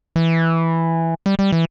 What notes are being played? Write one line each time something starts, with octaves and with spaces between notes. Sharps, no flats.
E3
G3
G3
E3